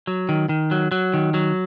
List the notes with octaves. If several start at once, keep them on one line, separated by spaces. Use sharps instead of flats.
F#3
D#3
D#3
F#3
F#3
D#3
F#3